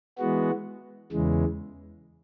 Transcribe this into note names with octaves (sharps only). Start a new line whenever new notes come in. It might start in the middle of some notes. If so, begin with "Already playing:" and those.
E3 G#3 B3 F#4
E2 C#3 E3 G#3